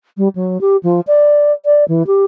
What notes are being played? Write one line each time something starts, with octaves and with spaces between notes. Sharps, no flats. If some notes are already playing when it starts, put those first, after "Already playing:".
G3
F#3
G4
F3
D5
D5
E3
G4